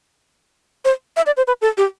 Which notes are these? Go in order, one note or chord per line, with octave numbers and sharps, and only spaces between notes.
C5
E5
D5
C5
B4
A4
G4